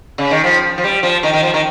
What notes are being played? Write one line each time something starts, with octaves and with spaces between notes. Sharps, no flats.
C#3
D#3
F3
F3
G3
F3
D#3
D#3
F3
D#3